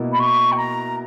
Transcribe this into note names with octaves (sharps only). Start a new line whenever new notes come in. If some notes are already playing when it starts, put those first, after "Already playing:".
Already playing: B2 A#3 E4
B5
C#6
G5
A#5